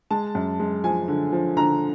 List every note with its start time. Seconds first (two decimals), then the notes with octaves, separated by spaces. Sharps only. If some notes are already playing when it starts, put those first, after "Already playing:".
0.11 G#3 A5
0.35 F#2
0.60 G#3
0.84 F3 G#5
1.08 D3
1.32 F3
1.57 D3 A#5